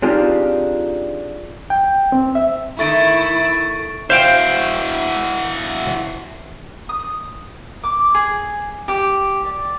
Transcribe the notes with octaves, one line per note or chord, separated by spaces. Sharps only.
C4 D4 D#4 F4 G4 G#4
G5
C4
E5
D#3 A3 E4 C#6 A6 D7
E4 F#4 C5 F5 G5
D#6
D6
G#4
G4
D5